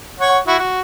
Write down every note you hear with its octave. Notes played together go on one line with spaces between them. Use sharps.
C#5 F#5
E4 F#4
F#4